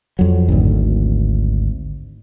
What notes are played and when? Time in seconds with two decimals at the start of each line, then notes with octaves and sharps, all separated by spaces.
0.19 F2 F#3
0.49 G#1 D2